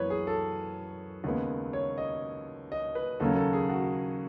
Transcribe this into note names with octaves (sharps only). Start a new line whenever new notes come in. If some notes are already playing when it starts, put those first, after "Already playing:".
Already playing: F#2 E3 B3 B4 C#5
G#4
A4
D#2 C#3 G#3 B3
C#5
D#5
D#5
B4
D#2 C#3 F#3 A4
A4
G#4
F#4